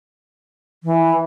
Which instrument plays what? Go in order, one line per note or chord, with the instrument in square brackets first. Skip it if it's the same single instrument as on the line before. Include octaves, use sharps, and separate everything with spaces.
[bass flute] E3